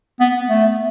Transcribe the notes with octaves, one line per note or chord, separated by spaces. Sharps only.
B3
A3